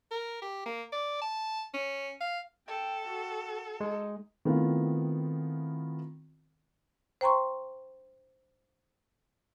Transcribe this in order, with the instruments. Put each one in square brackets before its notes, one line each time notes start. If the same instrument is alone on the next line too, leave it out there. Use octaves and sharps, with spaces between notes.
[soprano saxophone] A#4
G4
A#3
D5
A5
C#4
F5
[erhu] A4 [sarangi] G5
[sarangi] F#4
[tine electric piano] G#3 [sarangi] D#4
[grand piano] D#3 A3 B3 C4 E4 F4
[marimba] C5 G5 A#5 C6 C#6